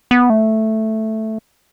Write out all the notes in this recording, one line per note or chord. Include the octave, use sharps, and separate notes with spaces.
B3
A3